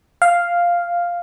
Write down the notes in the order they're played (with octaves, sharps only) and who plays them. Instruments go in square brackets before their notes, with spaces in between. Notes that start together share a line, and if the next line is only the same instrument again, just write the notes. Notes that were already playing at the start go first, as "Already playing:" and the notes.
[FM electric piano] F5